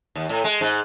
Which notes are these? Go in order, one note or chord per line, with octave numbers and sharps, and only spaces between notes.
D#2
A2
G#3
G#2